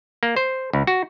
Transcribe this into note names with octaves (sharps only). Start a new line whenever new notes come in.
A#3
C5
C#2
F#4